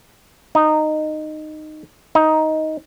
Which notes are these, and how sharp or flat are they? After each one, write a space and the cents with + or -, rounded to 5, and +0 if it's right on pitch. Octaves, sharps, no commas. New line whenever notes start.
D#4 -15
D#4 +10